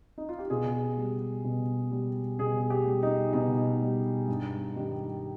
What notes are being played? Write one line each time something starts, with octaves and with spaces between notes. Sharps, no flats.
D#4
F4
G4
B2 G#4
G3
B2
G3
B2 G#4
G4
G3
D#4
B2 D#4
G3
G2
D#3 G3